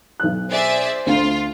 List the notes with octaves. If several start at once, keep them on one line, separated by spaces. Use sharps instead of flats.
B1 F#6
G#4 C5 D5 E5
D2 F4